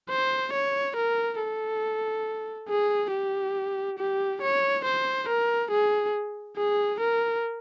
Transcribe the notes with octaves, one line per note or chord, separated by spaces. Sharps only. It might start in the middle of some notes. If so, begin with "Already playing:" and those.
C5
C#5
A#4
A4
G#4
G4
G4
C#5
C5
A#4
G#4
G#4
A#4